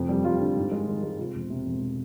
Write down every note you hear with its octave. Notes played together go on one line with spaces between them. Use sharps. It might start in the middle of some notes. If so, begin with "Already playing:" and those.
Already playing: F1 F2 E4
G3
G3 F4
D3
G#2
G#3
D#3
G#3
C3 F4
E1
C3
E1